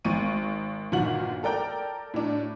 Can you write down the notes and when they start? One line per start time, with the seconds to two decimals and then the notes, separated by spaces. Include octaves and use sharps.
0.05 G#1 C#6 D#7
0.92 G1 A#2 D#3 F4 F#4 F#7
1.43 A4 A#4 D5 G5 A#5
2.14 A2 D4